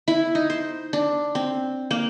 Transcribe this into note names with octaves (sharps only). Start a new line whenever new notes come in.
E4
D#4
C5
D4
C4
A#3